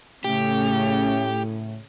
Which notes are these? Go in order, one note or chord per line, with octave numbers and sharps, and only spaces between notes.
A2 C#3 A3 C#4 G4